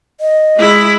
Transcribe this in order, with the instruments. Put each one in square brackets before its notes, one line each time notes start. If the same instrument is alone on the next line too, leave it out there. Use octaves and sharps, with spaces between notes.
[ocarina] D#5
[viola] G#3 E4